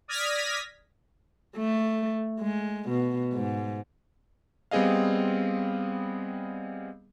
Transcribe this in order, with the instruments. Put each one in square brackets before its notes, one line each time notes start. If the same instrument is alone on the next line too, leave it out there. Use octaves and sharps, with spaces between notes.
[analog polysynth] D5 D#6 F6 G#6 A#6 B6
[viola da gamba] A3
G#3
B2
G#2
[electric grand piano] G3 B3 C4 G#4 D#5 F5